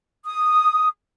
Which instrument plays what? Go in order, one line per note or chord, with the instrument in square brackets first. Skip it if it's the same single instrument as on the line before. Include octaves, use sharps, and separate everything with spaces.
[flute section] D#6